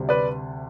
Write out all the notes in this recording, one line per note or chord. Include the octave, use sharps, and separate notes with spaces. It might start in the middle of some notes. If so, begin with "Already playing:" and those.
Already playing: D2 C3 G3
B4 D5